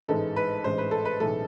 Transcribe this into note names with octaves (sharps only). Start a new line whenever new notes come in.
A1 G#2 E3 G#3 A4
B4
A1 G#2 E3 G#3 C5
B4
A4
B4
B1 A2 E3 G#3 A4